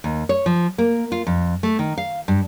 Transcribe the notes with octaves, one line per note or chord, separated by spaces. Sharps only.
D#2
C#5
F3
A#3
F4
F2
A3
D#3
F5
G2